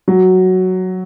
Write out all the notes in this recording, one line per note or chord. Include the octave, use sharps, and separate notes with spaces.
F#3